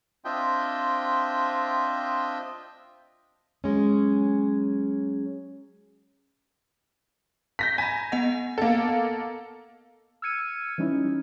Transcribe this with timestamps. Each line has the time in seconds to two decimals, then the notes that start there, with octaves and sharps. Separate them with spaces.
0.25 C4 D4 F4 D#5 E5 G5
3.64 F#3 G#3 C#4
7.59 G6 A#6 B6
7.78 G#5 A#5 B5
8.12 B3 D#5 F#5
8.58 A#3 A4
10.22 E6 F6 G#6 C#7 D#7
10.78 E3 G3 C#4 D#4 E4